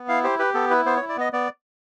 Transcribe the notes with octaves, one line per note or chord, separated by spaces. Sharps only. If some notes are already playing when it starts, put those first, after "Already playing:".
Already playing: B3
E4 F5
G4 C5
G4 B4
B3 A4
E4 B4
B3 C5
C#5
E4
D5
B3 D#5
B3 D5